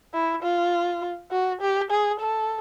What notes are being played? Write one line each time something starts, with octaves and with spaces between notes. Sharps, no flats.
E4
F4
F#4
G4
G#4
A4